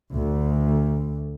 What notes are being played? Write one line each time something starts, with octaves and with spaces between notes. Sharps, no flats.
D2